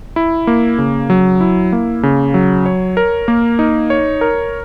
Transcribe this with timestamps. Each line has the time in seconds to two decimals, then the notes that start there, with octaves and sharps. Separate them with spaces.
0.16 E4
0.47 A#3
0.78 C#3
1.10 F#3
1.41 E4
1.73 A#3
2.03 C#3
2.34 F#3
2.66 C#5
2.97 A#4
3.28 A#3
3.59 D#4
3.90 C#5
4.21 A#4